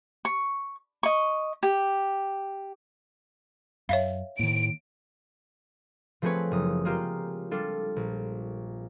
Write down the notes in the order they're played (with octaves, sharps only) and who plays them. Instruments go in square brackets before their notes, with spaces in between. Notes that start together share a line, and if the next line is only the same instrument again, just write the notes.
[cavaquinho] C#6
D#5 C#6
G4
[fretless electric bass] F#2 [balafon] C#5 E5 F5
[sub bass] A2 [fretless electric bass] D#3 A#3 [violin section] D7
[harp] F3 A3 C4 G#4 B4 C#5
F#1 D#6
G#3 A#3 F4 G4
G3 D4 F4 A4
A#1